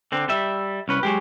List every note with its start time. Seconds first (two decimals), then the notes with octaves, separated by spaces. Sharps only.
0.12 D3 C4
0.29 G3 E5
0.88 C2 C#4 B4
1.03 F#3 G#3 G4